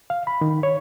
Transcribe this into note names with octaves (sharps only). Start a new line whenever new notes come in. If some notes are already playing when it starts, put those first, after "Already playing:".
F5
B5
D#3
C#5